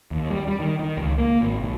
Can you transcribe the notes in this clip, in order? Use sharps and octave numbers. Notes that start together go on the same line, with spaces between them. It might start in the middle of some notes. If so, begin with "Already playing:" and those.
D#2
G3
G3
D#3
D#3
C#2
A#3
G#1
B1